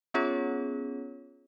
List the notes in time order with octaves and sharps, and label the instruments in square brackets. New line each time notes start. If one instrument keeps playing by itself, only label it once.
[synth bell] B3 C#4 F4 G#4 C#5